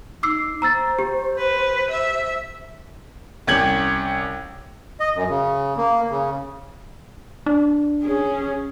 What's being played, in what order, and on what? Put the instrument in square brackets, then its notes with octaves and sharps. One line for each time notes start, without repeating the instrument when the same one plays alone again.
[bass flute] D#4 [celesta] D6 E6 C7
[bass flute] C5 [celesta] A#5 E6 A6
[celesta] G4
[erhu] B4
E5
[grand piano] C2 C#4 G4 G#6 F#7
[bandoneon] D#5
F#2
C#3
A#3
C#3
[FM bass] D4
[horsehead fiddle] C#4 G#4